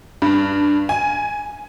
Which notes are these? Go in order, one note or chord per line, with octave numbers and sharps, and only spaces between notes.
G2
G#5